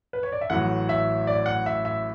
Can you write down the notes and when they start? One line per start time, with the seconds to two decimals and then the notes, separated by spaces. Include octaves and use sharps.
0.13 B4
0.23 C#5
0.32 D5
0.41 E5
0.50 A1 A2 F#3 F#5
0.89 E5
1.27 D5
1.46 F#5
1.66 E5
1.85 E5